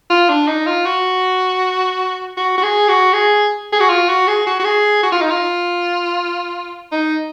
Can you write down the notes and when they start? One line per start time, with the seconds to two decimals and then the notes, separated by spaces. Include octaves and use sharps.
0.10 F4
0.29 D4
0.47 D#4
0.66 F4
0.86 F#4
2.37 F#4
2.58 F#4
2.63 G#4
2.88 F#4
3.13 G#4
3.72 G#4
3.80 F#4
3.89 F4
4.08 F#4
4.28 G#4
4.46 F#4
4.59 F#4
4.64 G#4
5.03 F#4
5.12 F4
5.21 D#4
5.30 F4
6.92 D#4